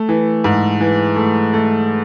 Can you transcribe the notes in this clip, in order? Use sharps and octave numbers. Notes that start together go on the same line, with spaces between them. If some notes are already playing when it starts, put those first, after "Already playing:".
Already playing: A3
E3
G#2
E3
A3
A3